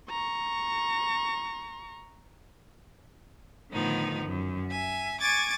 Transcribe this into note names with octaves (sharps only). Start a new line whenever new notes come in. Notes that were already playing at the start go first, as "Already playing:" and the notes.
A#5 C#6
A2 D3 D#3 F3 B3 D#4
F#2
E5 G#5
G#5 C#6 D6 G#6 A6